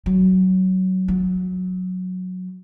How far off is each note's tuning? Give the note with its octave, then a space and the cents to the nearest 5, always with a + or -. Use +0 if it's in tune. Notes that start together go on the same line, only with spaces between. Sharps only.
F#3 +15
F#3 -10